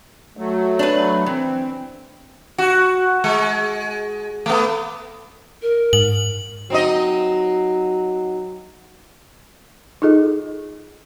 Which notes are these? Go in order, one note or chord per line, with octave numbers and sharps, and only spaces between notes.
F#3 A3
D4 B4
E3 C4
F#4
G#3
A3 B3
A#4
G#2 F#7
F#3 C4 D#4 D#5
D#4 F4 G#4 A4 D#5